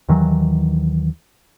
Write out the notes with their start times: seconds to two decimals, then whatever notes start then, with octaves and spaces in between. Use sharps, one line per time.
0.09 D#2 D#3 E3 F#3